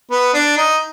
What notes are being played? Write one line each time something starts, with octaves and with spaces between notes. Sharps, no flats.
B3
D4
D#4